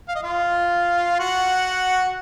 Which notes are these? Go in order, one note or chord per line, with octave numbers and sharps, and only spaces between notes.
F5
D#5
F4 F5
F#4 F#5